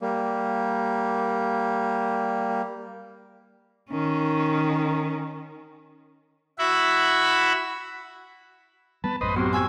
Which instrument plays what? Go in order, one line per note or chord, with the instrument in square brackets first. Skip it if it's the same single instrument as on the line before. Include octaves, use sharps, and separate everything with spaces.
[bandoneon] G3 A#3
[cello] D#3 C#4
[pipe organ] E4 F#4 E5 B5
[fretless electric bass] G3 B3 [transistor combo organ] B4 A5
[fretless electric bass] A1 F#2 A2 [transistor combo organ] B4 C5 D#5
[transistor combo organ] F#3 C5 [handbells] B3 C4 G4
[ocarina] G#5 [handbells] C#6 E6 G#6